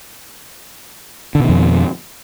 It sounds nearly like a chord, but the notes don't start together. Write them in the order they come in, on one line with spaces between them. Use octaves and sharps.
D3 B2 D#3 F2